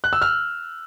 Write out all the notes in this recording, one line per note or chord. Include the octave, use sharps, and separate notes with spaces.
F#6
E6
F6